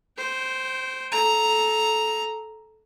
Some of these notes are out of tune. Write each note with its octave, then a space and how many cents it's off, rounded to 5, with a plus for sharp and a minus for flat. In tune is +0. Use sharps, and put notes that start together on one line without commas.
C5 +0 G5 -25
A4 -20 A#5 +0